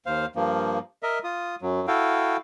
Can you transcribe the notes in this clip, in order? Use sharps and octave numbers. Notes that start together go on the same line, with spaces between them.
D#2 C5 F5
G2 F3 A#3
A#4 D#5 E5
F4 D#6
F#2 F#3
E4 F#4 A4 F5 G5